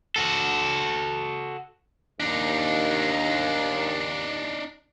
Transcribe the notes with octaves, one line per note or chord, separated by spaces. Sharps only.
F#4 A4
D#2 D4 D#4